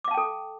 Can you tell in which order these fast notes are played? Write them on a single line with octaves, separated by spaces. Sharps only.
D6 F5 A5 G5 A4